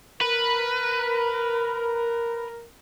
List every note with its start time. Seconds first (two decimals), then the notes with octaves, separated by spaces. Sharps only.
0.21 A#4 B4